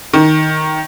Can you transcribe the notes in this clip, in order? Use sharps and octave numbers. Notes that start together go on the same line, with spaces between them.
D#3